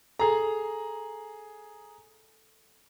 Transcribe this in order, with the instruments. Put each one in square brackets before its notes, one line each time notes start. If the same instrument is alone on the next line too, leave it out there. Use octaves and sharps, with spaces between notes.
[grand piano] G#4 A#5 [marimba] A4